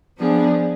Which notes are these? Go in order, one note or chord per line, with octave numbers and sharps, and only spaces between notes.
F3 B3 D4 G#4